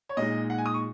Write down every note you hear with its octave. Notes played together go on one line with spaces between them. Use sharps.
C#5
A#2 G#3 D#4 D#5
F#5
G#5
D#6
C#6